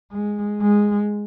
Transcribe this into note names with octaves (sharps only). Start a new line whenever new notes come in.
G#3
G#3